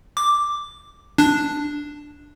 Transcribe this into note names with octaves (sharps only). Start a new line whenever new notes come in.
D6
D4